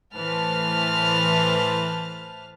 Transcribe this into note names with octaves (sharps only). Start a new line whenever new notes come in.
A2 E3 B4 C5 A5 F6